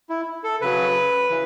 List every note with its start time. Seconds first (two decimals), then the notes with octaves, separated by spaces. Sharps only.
0.10 E4
0.44 A4
0.61 C#3 F#3 B4
1.30 C#3 E3